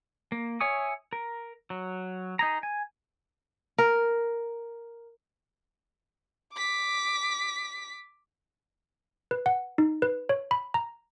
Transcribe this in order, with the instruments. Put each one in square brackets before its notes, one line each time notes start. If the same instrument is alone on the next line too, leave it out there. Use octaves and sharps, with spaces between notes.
[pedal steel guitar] A#3
C#5 E5 G#5 C#6 D#6
A#4
F#3
D#4 G#4 A#5
G#5
[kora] A#4
[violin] D6 B6
[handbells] B4
F#5
D#4
B4
C#5
B5
A#5